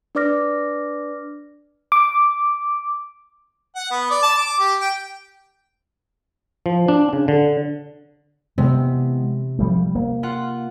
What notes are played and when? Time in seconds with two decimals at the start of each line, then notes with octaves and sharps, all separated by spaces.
0.15 D4 B4 D5 D6 F6 A#6
1.92 D6
3.75 F#5
3.91 B3
4.11 D5
4.23 A5
4.37 D6
4.60 G4
4.80 G5
6.66 F3
6.88 D4
7.13 C#3
7.28 D3
8.58 C3 E3 G#3 B3
9.59 F3 G3 A3
9.95 A#3
10.23 F4 F#5